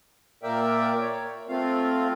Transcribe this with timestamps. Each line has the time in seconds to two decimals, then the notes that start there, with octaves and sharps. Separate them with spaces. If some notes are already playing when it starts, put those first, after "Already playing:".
0.43 A#2 A#3 A#4 D5 E5 G5
1.00 C#5
1.49 A3 C4 F4 F5